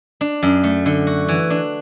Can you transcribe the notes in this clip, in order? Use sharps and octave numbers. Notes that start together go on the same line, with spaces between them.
D4
F#2
A3
D3
F#4
E3
D4